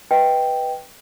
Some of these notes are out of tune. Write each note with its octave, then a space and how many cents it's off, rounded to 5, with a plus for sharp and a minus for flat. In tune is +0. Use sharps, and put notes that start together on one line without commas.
B4 +0 D#5 +15 G5 +0